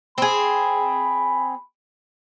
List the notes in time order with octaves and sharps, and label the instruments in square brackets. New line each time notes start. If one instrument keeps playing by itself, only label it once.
[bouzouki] C4 G#4 [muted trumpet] B5